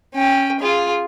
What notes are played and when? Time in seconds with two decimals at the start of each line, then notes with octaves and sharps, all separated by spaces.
0.14 C#4 G5
0.60 F4 G#4